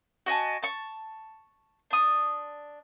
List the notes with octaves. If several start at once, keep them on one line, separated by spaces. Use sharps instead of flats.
F#4 D#5 G#5 A5
A5 C#6
D4 D#6